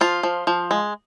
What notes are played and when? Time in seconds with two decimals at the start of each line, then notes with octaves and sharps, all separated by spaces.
0.01 F3 F4
0.23 F3
0.47 F3
0.71 G#3